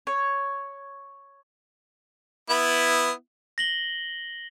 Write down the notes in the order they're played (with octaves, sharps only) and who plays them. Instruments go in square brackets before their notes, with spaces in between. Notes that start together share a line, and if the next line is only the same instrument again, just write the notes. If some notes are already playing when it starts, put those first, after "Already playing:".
[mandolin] C#5
[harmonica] B3 E4
[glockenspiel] A#6 F#7 G7